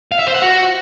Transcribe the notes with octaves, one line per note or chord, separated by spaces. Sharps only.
F5
E5
C5
F#5
F#4